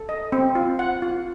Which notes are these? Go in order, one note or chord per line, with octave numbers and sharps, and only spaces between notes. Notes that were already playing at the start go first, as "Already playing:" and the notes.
Already playing: A4
D#5
C4
F4
F#5
F4